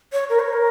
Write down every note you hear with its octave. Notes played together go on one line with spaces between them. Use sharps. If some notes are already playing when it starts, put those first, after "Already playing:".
C#5
A#4
C#5
A#4